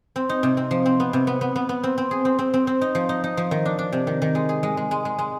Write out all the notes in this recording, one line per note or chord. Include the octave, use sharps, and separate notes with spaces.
C4
D#4
C3
C4
F3
C4
B3
C3
B3
B3
B3
B3
C4
C4
G#4
C4
C4
C4
C4
D#4
F3
D#4
D#4
F3
D#3
D4
D4
C3
D#3
D#3
G#3
G#4
G#3
G#3
G#3
G#3
G#3